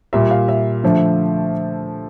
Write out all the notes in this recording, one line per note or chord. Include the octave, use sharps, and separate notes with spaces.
A#2 G3 E5
F5
E5
D3 F3 A3